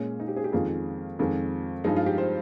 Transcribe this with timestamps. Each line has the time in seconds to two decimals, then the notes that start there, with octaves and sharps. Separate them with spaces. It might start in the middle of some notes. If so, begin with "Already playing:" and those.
Already playing: A#2 G#3 C#4
0.20 D#4
0.28 G4
0.36 G#4
0.44 G4
0.53 F2 D#3 G#3 F4
1.19 F2 D#3 G#3
1.84 G2 F3 G#3 D#4
1.96 F4
2.06 G4
2.18 C5